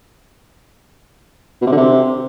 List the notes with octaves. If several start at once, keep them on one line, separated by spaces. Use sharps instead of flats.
B2
C3
D3
C3